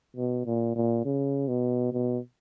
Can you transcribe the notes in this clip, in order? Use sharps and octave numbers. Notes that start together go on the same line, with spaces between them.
B2
A#2
A#2
C#3
B2
B2